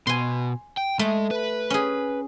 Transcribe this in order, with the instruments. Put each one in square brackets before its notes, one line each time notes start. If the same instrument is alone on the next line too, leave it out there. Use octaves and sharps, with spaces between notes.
[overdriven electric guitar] B2 [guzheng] G#5 C6
[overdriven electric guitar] G5
[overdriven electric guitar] G#3 [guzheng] A3
[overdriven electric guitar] B4
[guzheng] C#4 G#4